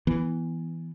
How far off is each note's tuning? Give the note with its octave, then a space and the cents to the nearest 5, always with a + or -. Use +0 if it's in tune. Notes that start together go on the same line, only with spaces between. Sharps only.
E3 +0 B3 -5